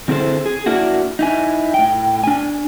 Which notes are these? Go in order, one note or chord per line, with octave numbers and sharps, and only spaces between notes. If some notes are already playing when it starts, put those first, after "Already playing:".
D3 C4 E4 G#4 A4 C5
G#4
A#3 D4 E4 F#4
D#4 E4 G#5
A2 G5
D4 G#5